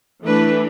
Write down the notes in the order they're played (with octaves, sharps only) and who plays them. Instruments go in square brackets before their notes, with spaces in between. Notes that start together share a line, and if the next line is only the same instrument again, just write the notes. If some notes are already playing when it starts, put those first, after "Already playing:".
[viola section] E3 A3 D4 B4